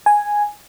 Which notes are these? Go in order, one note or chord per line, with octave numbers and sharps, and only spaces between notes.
G#5